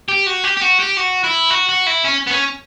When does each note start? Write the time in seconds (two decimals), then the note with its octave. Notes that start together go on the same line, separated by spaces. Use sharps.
0.08 G4
0.27 F#4
0.44 G4
0.57 G4
0.62 F#4
0.80 G4
0.97 F#4
1.24 E4
1.50 F#4
1.69 F#4
1.87 E4
2.04 C#4
2.27 B3
2.31 C#4